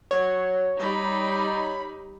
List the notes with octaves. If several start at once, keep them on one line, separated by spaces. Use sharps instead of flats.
F#3 C#5
G3 D#4 B5